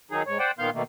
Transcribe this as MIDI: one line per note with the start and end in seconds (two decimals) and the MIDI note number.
0.11 0.23 51
0.11 0.23 54
0.11 0.23 63
0.11 0.23 68
0.26 0.38 44
0.26 0.38 73
0.39 0.51 72
0.39 0.51 74
0.39 0.51 78
0.39 0.51 79
0.59 0.70 46
0.59 0.70 51
0.59 0.70 59
0.59 0.70 77
0.59 0.70 84
0.59 0.70 91
0.74 0.83 47
0.74 0.83 51
0.74 0.83 57
0.74 0.83 58